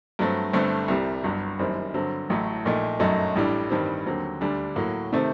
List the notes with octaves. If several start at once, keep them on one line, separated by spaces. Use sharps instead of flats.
G2 F#3 A3 C4
G1 G2 D3 A3 C4
C2 C3 G3
G1 G2 F#3
F#1 F#2 D#3 G3 C4
G2 D3 F#3 C4
A1 A2 F#3 A3
A#1 A#2 A3 D#4
G1 F#2 F#3 A3 D#4
A1 A2 G3 D4
A1 G2 D#3 G3 C4
D#2 D3 F#3 C4
D2 D3 G3 D4
A2 F#3 A#3 F#4
C3 D#3 A3 C4